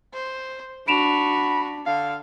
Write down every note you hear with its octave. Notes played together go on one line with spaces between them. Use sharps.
C5
D4 F#4 B5 D7 E7 F7
D3 F5